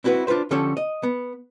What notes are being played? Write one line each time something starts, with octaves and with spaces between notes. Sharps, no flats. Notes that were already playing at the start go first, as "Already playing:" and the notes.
C4 E4 F#4 A4 B4
D4 F4 F#4 B4 C5
D3 F3 C#4 G4 A4 C#5
D#5
B3